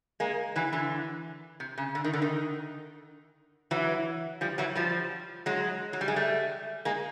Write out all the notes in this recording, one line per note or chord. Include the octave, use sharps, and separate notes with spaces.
G#3 A#3
E3 F#3
D3 E3
C3
C#3
D3
D#3
D3
D#3
E3 F#3
F3 G3
E3 F#3
F3 G3
F#3 G#3
F#3
G3
G#3
G3 A3
G#3 A#3